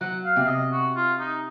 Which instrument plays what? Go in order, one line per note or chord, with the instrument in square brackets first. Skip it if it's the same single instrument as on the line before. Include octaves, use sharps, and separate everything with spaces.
[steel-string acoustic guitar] F#3 [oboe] F#5
[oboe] F5
[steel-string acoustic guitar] C3
[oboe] F5
D#5
F#4
F4
D#4